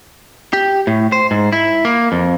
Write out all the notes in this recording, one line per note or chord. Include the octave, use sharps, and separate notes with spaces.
G4
A2
C5
G#2
E4
A#3
F2